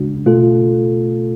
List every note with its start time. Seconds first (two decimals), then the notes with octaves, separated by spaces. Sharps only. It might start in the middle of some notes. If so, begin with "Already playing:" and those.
Already playing: C#3 G#3 D4 F#4
0.26 B2 A3 F4 A4